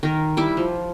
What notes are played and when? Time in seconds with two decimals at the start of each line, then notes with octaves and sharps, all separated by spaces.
0.03 D#3 A#4
0.37 G3 E4 D6
0.57 F3